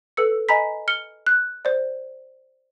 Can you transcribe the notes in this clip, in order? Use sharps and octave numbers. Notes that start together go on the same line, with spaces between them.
A4 B4 E6 C#7
D#5 G#5 A#5 B5 B6
F6 C#7 G7
F#6
C5 D5